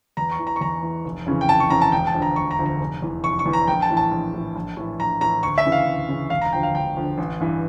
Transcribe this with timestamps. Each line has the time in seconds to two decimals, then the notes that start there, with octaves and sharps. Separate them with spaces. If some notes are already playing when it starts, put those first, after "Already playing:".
0.17 E2 A#5
0.32 C#6
0.39 E3
0.47 A#5
0.56 C#6
0.61 E2 A#5
0.82 E3
1.05 F1
1.26 F2 C#3 E3
1.41 G5
1.49 F1 A5
1.60 C#6
1.70 F2 C#3 E3 A#5
1.81 A5
1.92 E1 G5
2.07 A5
2.14 D2 D3 F3
2.22 A#5
2.36 E1 C#6
2.51 A#5
2.58 D2 D3 F3
2.66 A#5
2.80 F1
3.02 E2 E3
3.23 F1 C#6
3.39 C#6
3.46 E2 E3
3.53 A#5
3.68 A#1 G5
3.82 A5
3.90 A2 E3
3.97 A5
4.11 A#1
4.34 A2 E3
4.56 A#1
4.77 A2 E3
4.99 A#1 A#5
5.21 A2 E3 A#5
5.43 D2 C#6
5.58 E5
5.65 C#3 E3
5.72 F5
5.87 D2
6.09 C#3 E3
6.30 E1 F5
6.42 A#5
6.52 D2 D3 F3 G5
6.63 F5
6.75 E1 G5
6.96 D2 D3 F3
7.18 A1
7.40 G2 E3